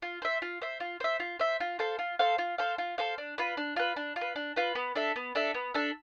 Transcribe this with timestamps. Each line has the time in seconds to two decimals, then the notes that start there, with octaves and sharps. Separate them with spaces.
0.02 F4
0.22 C5 E5
0.42 F4
0.62 C5 E5
0.80 F4
1.00 C5 E5
1.20 F4
1.39 C5 E5
1.60 F4
1.79 A4 C5 F5
1.99 F4
2.19 A4 C5 F5
2.38 F4
2.58 A4 C5 F5
2.78 F4
2.98 A4 C5 F5
3.18 D4
3.38 F4 B4
3.57 D4
3.76 F4 B4
3.96 D4
4.16 F4
4.21 B4
4.36 D4
4.56 F4 B4
4.75 B3
4.95 D4 A4 E5
5.16 B3
5.35 D4 A4 E5
5.54 B3
5.74 D4 A4 E5